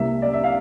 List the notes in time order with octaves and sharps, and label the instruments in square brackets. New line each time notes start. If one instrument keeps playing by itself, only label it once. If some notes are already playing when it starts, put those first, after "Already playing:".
Already playing: [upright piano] C2 C3 G3 A#3 E5
D5
E5
F5